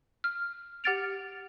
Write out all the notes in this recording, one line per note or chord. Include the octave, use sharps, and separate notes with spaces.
F6
G4 F#5 F6 A6 D7 F7